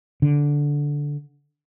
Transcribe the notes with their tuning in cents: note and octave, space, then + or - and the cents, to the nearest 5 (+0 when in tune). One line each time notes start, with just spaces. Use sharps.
D3 -10